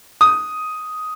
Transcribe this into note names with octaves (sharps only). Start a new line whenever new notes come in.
D#6